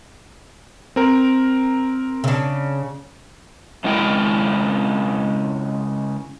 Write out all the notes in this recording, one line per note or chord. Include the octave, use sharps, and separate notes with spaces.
C4 A#4
C#3 D4
C#3 G#3 E4 A#4 G5